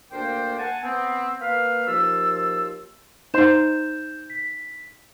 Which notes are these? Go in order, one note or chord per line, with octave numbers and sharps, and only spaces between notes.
D2 A#3 D4 A#4 C5 G5
F#5 G#5 A5
B3 C4
A#3 B4 F5
D#2 F3 F4 A#4 E6
D#4 C5 C6 G6 E7
B6